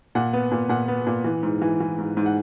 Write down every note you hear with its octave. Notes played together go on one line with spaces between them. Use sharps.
A#2 F#5
B3
A#2
A#2 F#5
B3
A#2
E3
G#2
E3
E3
G#2
G#2
F#5